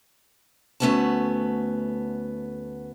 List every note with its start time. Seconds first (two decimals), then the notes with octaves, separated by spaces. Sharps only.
0.80 D2 A3 B3 C#4 F#5 A5